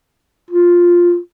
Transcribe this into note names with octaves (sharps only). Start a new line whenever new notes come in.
F4